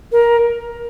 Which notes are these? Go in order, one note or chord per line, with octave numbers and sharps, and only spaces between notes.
A#4